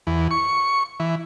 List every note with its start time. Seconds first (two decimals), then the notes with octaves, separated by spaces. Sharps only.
0.07 E2
0.31 C#6
1.00 E3